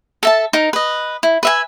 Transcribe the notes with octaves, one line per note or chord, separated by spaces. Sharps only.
A4 E5 A5
D#4 A#4
B4 D#5
E4
B4 E5 G#5